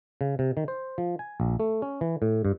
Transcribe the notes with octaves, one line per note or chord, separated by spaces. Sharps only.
C#3
C3
D#3
C5
F3
G#5
A#1
A3
C#4
E3
A2
G2